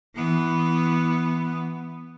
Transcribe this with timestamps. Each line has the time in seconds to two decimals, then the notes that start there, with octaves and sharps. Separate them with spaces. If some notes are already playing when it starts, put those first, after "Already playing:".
0.15 E3 B3